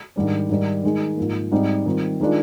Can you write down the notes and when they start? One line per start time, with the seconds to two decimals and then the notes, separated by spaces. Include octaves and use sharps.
0.16 G#2 D#3 G3 D4
0.49 G#2 D#3 G3
0.84 D#3 G#3 D#4
1.17 G#2 F3 A#3
1.52 G#2 G3 C4 D#4
1.86 D#3 G3 C4 F4
2.20 D#3 G#3 D4 F4